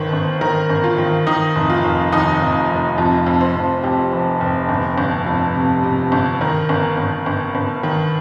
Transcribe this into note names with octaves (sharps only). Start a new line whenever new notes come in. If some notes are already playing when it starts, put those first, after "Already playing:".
Already playing: G1 D#3 C5
G1
D#3 A#4
G1
F4
D#3
D#3 D#4
F1
F4
F1
D#2 D#4
F1
F1
F2 F4
F2
C5
F2
F2 G4
F1
F1
G1
G1
F2
C3
C3
G1
D#3 A#4
G1
G1
G1
G1
D#3